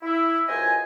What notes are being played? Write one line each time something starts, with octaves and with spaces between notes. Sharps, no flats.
E4
C#2 F#2 C5 D#5 G#5